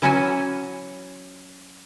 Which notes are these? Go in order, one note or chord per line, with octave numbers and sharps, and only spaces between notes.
E3 F#3 C#4 F#4 E5 G#5